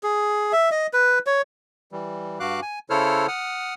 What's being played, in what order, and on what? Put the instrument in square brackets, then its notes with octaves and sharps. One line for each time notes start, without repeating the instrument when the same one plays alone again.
[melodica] G#4
E5
D#5
B4
C#5
[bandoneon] E3 G3
G2 F#4 F5 D6 F#6
G#5
C#3 E4 A4 C5 C#5 F6
F#5 D#6 F6